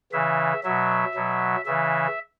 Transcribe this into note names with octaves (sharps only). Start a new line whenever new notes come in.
C#3 E3 E5
B2 F#3 E5
B2 F#3
C#3 E3 E5